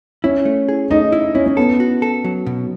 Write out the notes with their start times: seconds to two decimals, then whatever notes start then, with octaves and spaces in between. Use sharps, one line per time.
0.24 C#4 E4
0.45 A3
0.69 G#4
0.90 A3 D#4
1.12 E4
1.35 C#4 E4
1.46 C#4
1.57 B3 A4
1.80 F#4
2.02 A4
2.24 F#3
2.46 B2